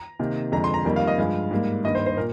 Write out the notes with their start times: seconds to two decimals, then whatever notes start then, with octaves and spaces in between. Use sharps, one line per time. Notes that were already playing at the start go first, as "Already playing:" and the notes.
Already playing: A#5
0.19 C3 D#3 A#3
0.52 F2 D3 G#3 A#5
0.64 C6
0.74 A#5
0.85 F2 D#3 G3 A#3
0.96 F5
1.07 D#5
1.18 G2 F3 G#3 F5
1.51 G#2 G3 A#3
1.84 G2 D#3 A#3 D#5
1.95 C5
2.06 C5
2.17 A#2 A#4